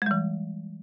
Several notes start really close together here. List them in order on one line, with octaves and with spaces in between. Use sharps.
G#3 G3 E3